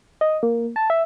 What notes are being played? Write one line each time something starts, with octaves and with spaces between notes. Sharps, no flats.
D#5
A#3
A5
E5